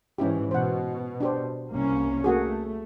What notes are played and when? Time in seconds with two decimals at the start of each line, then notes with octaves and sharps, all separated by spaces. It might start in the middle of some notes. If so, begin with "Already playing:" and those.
0.18 G#2 E3 C#4 E4 G4
0.51 B2 C5 F#5
1.20 D4 G4 C5
1.71 C2 A#3 C#4
2.24 A3 A#3 F#4 G#4